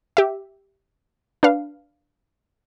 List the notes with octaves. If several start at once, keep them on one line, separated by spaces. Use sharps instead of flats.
G4 E5
D4 B4 F5